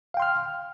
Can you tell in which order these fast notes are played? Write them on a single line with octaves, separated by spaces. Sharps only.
F5 G5 C6 F6